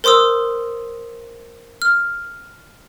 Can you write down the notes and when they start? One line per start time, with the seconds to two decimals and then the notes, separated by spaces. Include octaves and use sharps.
0.04 A#4 C5 C6 D#6 E6
1.82 F6